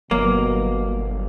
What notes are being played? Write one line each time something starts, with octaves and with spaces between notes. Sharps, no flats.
G1 B2 F#3 A#3